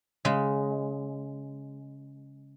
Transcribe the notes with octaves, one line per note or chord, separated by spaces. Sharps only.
C#3 G#3